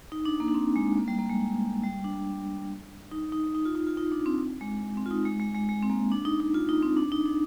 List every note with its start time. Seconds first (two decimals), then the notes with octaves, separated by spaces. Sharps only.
0.12 D#4
0.25 D4
0.40 A#3
0.48 D4
0.55 C4
0.76 G#3
0.97 A#3
1.08 G3
1.19 A#3
1.29 G#3
1.83 G3
2.04 D4
3.11 D#4
3.32 D#4
3.55 D#4
3.65 F4
3.75 D#4
3.87 F4
3.97 D#4
4.12 D4
4.26 C4
4.61 G#3
4.97 C4
5.06 F4
5.11 D#4
5.25 G#3
5.40 G#3
5.54 G#3
5.69 G#3
5.82 C4
5.90 A#3
6.12 D4
6.25 D#4
6.40 D#4
6.54 F4
6.69 D#4
6.83 C4
6.97 D4
7.12 D#4
7.25 D4